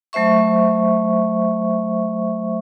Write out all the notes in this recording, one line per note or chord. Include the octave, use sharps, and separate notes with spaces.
F#3 A3 C5 E5 C#6